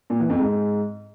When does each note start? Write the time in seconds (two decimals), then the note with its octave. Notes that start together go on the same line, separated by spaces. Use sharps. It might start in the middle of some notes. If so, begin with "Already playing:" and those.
0.10 A#2
0.20 E3
0.30 F2
0.39 G#2